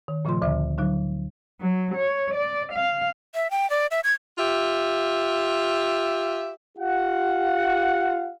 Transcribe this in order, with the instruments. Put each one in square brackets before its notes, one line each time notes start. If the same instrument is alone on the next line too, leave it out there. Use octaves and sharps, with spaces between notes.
[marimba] D#3
A#2 C#3 F3 A3 F4 C6
D2 D3 E5
D3 F#3 D#4
[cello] F#3
C#5
D5
F5
[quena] E5
G5
D5
E5
G#6
[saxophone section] F4 G4 E5
[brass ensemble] F4 G4 F5 F#5